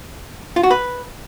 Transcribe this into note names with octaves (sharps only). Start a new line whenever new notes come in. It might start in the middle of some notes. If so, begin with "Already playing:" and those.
F4
F#4
B4